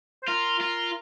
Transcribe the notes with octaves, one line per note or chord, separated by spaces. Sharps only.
C5
F4 A#4
F4